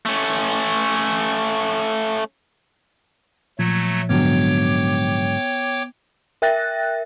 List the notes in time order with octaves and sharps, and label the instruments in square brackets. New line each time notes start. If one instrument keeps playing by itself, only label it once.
[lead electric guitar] A3 C#4
[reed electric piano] A#2 F3 [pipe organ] F#3 A3 G#6
[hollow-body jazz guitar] G#2 D3 F#3 [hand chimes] B3 [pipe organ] C#5 G5 D6
[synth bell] A#4 E5 G5 F#6 A6 A#6